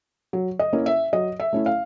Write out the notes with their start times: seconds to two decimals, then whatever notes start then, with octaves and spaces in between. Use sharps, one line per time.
0.33 F#3
0.59 D#5
0.73 A#3 C#4 E4
0.86 E5
1.13 F#3 D#5
1.40 E5
1.53 A3 C#4 E4
1.66 F5